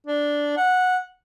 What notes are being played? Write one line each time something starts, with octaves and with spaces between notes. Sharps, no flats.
D4
F#5